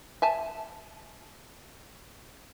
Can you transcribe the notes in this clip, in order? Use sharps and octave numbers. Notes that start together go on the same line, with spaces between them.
E5 G#5 A5